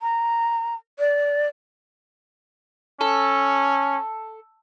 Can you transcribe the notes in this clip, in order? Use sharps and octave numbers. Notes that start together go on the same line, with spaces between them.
A#5
D5
C#4 A4